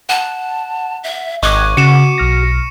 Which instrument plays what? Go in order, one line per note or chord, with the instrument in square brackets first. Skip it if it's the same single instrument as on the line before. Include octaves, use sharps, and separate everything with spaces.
[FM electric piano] F#5 [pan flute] A5
[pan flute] E5
[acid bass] G#1 [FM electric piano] D#5 F#6 G#6 [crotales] C#6 [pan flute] D6
[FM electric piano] C#3 [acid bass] F#4 [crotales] C#7 E7
[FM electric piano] B1 F6 A#6